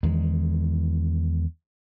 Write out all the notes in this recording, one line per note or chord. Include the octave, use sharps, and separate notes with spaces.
E2 D#3 G#3